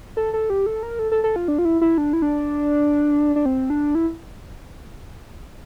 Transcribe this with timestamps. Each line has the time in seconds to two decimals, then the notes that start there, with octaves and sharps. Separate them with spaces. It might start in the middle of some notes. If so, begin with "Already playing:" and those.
0.17 A4
0.34 A4
0.50 G4
0.66 A4
0.83 A#4
0.99 A4
1.12 A4
1.24 A4
1.36 F4
1.48 D4
1.59 F4
1.65 E4
1.81 E4
1.98 D4
2.13 E4
2.22 D4
3.36 D4
3.46 C4
3.70 D4
3.95 E4